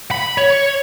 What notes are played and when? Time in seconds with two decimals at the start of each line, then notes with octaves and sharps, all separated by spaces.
0.11 B5
0.38 C#5